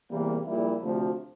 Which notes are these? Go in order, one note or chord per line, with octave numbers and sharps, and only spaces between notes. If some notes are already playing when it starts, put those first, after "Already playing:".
E2 C3 E3 G3 A#3
A#1 A#2 G3 A#3 E4
D2 C3 F3